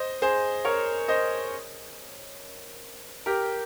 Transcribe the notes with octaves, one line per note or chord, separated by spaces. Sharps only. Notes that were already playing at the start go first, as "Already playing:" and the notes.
Already playing: C5 D#5
G#4 C5
A#4 C#5
C5 D#5
G4 A#4